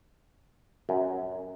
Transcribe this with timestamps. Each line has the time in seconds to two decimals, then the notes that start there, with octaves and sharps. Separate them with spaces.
0.89 F#2